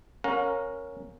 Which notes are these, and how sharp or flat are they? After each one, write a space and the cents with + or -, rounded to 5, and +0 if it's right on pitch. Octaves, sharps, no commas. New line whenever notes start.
C#4 +0 A#4 +0 F5 +45